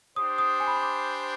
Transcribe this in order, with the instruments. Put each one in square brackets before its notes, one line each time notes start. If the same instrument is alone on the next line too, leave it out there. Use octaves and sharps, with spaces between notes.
[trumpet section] D4 G4 C5 [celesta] D#6
[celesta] D#6
G#5
B5
C6
D6